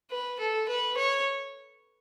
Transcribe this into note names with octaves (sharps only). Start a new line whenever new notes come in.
B4
A4
B4
C#5